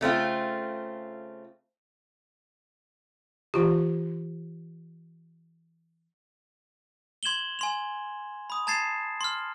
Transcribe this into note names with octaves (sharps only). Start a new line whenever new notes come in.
C#3 A3 C4 F4
E3 F4 G4
C6 G#6 E7 F#7 G7
G#5 C6 F7
B5 D#6
A5 A#5 G#6 A6 C7 E7
C6 F6